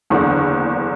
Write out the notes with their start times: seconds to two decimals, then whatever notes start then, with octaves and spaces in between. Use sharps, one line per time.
0.10 F#1 E2 D3